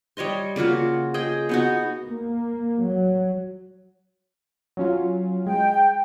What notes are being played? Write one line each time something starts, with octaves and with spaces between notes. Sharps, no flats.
G3 C#5 D#5 C6
C#3 A#3 F4 F#4
G#4 D#5 G5
B3 D#4 F#4
A#3
F#3
F#3 C#4 F4
G#3 G5